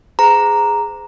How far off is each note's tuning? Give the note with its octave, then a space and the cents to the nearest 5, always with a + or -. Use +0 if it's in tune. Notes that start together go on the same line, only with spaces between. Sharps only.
G#4 +0 C5 -40 A#5 +0